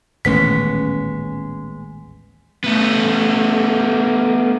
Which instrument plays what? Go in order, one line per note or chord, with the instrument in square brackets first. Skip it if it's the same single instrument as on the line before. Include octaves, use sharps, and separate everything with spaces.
[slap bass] D#1 A1 [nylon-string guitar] G#3 B3 C#4 [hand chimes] B6
[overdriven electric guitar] A3 B3